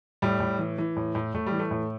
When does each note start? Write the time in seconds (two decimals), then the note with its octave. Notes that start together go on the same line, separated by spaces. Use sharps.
0.22 A2 G3
0.40 A2
0.59 E3
0.78 E3
0.97 A2
1.15 A2
1.34 A2 A3
1.46 G3
1.52 E3
1.59 A3
1.71 A2